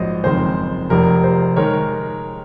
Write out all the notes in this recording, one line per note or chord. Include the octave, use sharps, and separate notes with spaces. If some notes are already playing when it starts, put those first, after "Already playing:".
Already playing: A#1 G#2 F#3 C5 D#5
F#1 F2 D#3 G#3 C4 C5
F1 F2 C3 A#4
C5
D#3 G#3 A#4 C#5